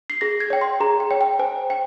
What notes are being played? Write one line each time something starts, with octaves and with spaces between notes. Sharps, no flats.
C7
G#4 A#6
G#6
C#5 G5
C6
G#4 A#5
G5
C#5 G5
G5
C5 G#5
G5